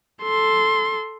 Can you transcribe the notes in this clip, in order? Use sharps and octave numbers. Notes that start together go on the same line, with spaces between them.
A4 C6